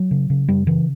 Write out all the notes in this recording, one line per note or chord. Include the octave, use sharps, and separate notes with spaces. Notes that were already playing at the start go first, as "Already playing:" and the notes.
Already playing: F#3
C#3
C#3
F#2 G3
C#3 E3